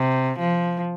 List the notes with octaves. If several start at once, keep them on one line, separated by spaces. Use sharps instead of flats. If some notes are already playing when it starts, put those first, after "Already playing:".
Already playing: C3
F3